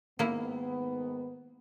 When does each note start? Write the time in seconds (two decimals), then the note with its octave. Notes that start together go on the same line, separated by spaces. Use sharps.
0.19 G#2 D#3 A#3 B3 E4